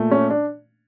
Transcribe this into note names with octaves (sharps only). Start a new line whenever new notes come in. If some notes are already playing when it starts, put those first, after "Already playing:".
Already playing: A#2 A3
C#4
D4